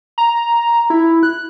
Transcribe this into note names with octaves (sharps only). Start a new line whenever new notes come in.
A#5
E4
F#6